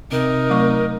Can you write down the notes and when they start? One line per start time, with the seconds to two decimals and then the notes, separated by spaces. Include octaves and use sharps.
0.12 C3 D#4 A#4
0.50 F#3 A3 C#6